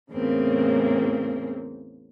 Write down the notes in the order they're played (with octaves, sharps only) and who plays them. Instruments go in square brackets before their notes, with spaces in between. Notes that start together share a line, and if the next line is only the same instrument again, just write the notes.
[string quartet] E2 A2 C#3 A#3 C4